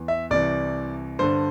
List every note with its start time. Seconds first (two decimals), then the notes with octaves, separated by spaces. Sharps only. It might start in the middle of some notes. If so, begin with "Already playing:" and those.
Already playing: E2 E3
0.08 E5
0.31 C2 C3 E3 D5
1.19 G2 D3 C5